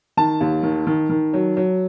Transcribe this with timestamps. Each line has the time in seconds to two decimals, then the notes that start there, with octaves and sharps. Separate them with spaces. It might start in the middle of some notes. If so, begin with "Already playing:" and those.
0.17 D#3 A5
0.40 D#2
0.63 D#3
0.87 D#3
1.10 D#3
1.33 F#3
1.57 F#3